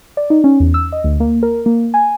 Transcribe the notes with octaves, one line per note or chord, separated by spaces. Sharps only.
D5
D#4
C#4
E2
E6
D#5
D2
A#3
A#4
A#3
G#5